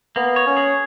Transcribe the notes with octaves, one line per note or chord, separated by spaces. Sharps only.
A#3 B3
C#5
C#4
G#4